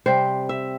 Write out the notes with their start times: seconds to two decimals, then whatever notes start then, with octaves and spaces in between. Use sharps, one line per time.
0.06 C3 G3 C4 C5
0.49 E5